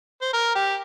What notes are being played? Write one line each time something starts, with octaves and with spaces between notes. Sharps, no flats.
C5
A#4
G4